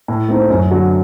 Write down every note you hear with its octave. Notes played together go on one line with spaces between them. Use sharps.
A2
A3 C4 D#4
F#2
D3 F#3